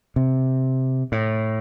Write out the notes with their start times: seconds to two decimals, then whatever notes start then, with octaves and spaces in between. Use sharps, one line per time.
0.16 C3
1.12 A2